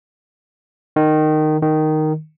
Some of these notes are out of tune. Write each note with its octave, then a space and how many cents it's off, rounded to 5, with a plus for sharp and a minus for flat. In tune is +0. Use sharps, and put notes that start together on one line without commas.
D#3 -15
D#3 -5